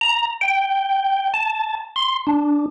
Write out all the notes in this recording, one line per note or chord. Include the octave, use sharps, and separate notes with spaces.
A#5
G5
A5
C6
D4